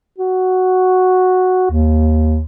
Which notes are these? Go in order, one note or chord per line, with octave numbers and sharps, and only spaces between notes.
F#4
D#2